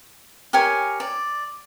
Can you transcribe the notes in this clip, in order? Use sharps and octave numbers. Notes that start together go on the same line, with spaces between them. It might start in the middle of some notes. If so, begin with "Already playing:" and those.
G4 A#4 C#5 G#5
D5